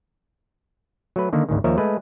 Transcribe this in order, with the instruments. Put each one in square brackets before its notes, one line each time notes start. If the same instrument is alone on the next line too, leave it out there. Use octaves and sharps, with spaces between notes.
[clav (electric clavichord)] F#3 A3 B4
D3 D#3 A#3
G#1 D2 G#2 D#3
D#2 F3 A#4 C#5 E5
G#3 A3 B4